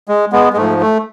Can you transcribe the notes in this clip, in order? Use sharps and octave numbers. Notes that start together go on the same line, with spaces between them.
G#3
G#3 B3
G#3
G#2 F3 A3
A3